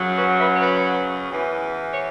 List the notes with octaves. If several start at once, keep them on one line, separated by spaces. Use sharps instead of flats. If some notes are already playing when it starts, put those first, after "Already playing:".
Already playing: F#2 C#3 F#3
F#4 B4
B4 E5
C#5
F#4 B4
E2 E3
C#5